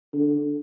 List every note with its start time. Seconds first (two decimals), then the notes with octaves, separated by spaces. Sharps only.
0.13 D3